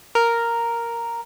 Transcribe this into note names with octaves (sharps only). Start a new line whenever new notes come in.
A#4